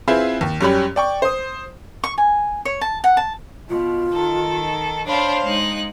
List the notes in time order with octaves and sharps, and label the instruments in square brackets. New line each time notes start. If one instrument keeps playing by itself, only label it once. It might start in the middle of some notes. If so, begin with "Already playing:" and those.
[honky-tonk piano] C4 E4 F4 G#4 B4 E5
D#2
F#2 G3 C#4 G4 B5
D5 G5 C#6
C5 D#6
[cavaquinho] C#6
G#5
C#5
A5
F#5
A5
[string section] B2 [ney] F4
[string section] D#3 [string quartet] A4
[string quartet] D4 B5 [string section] C5 F5 C6 [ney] C#5
[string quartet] G#3 D#4 F#6